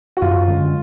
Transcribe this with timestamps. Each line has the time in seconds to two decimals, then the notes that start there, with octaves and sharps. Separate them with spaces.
0.17 F#4
0.22 F#2 F4
0.48 D3 G#3 C#4